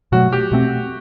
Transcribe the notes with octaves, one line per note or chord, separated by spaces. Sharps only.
B2 F#3 A3 F#4
G4
B2 A3 C4